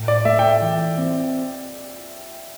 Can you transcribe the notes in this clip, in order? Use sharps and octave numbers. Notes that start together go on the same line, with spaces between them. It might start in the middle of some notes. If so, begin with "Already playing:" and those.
Already playing: A2
D5
A3 E5
G5
E5
E3
C4